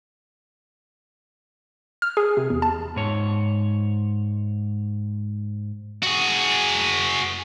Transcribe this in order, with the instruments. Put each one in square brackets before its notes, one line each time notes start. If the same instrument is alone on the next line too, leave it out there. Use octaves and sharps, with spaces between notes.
[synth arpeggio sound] F6
G#4
C3
E2
A5
[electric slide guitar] G#2 C#5
[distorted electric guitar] F#4 G#4